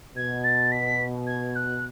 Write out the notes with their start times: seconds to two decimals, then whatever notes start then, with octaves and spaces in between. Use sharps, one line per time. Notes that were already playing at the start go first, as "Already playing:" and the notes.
0.16 B2 G#6
0.44 A6
0.72 B6
1.27 G#6
1.56 F#6